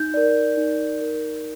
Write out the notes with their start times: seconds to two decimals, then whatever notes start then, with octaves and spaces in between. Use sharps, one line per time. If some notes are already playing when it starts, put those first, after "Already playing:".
Already playing: D#4 G6
0.14 A#4 D5
0.57 D#4
1.01 A#4 D5